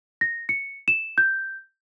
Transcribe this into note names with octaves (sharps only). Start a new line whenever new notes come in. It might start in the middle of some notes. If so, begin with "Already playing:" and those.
A#6
C#7
E7
G6